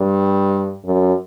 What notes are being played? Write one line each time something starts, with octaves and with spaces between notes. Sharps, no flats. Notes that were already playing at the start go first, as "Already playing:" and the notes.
Already playing: G2
F#2